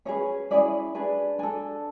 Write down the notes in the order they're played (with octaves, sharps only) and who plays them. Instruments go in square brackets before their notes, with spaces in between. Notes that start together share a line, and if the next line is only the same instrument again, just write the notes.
[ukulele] C#4 E4 G#4 B4 C#5
C#4 E4 G#4 D5
D4 G#4 B4
D4 A4 G#5